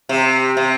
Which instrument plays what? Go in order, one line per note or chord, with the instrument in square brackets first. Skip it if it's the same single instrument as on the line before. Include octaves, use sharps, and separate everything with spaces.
[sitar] C3
C3